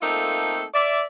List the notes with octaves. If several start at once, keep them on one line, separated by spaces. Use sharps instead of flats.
A3 A#3 C4 D#4 F4 A4
D5 E5